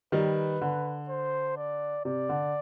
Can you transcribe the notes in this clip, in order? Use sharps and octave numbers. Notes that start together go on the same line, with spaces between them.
D#3 G3 B4
D3
C5
D5
C3 D5
D3